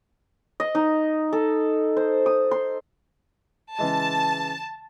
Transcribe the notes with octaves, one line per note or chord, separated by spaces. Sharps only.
D#5
D#4
A4
C5
D#6
C6
C#3 E3 G#3 A5